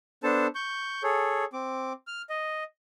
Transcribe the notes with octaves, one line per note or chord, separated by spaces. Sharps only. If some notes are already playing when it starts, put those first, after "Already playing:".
B3 D4 A4 C5 A5
C#6 G6
G#4 A4 C#5
C4 D6
F6
D#5